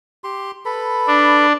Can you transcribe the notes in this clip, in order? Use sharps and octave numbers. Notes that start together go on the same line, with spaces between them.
G4 C6
A4 B4 B5
D4